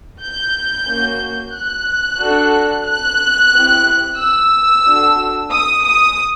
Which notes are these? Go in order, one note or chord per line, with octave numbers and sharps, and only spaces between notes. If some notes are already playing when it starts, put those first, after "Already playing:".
G6
A#3 C#4 F#4
F#6
D4 F#4 A4
F#6
C4 E4 G4
E6
D4 F#4 A4
D#6
D#6